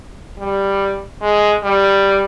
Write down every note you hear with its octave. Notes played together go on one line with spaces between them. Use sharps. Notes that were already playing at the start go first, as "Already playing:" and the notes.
G3
G#3
G3